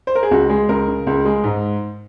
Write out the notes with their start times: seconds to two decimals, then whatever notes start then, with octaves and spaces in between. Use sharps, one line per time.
0.07 C5
0.15 A#4
0.23 G#4
0.31 C#2 F#4
0.49 G#3 G#4
0.69 C#2 A#4
0.88 C#3
1.07 C#2
1.25 G#3
1.44 G#2